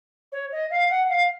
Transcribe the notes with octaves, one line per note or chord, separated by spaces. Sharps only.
C#5
D#5
F5
F#5
F5